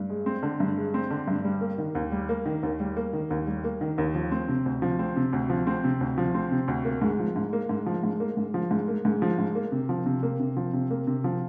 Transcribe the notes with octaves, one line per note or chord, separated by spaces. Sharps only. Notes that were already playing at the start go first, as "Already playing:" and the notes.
Already playing: G2
G#3
C4
D3
G2
G#3
C4
D3
G2
G3
A#3
D#3
D#2
G3
A#3
D#3
D#2
G3
A#3
D#3
D#2
G3
A#3
D#3
D#2
F3
C4
C3
D2
F3
C4
C3
D2
F3
C4
C3
D2
F3
C4
C3
D2
A#3
G#2
F3
G#2
A#3
G#2
F3
G#2
A#3
G#2
F3
G#2
A#3
G#2
F3
G#2
A#3
C3
F3
C3
A#3
C3
F3
C3
A#3
C3
F3